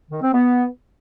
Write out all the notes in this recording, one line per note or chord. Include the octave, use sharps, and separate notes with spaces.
D#3
C4
B3